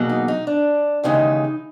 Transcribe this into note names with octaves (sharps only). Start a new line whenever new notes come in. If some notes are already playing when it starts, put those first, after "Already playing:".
Already playing: E2 B2 F#3 A#3
D#4
D#4
D4
D#2 C#3 E3 G#3 D#4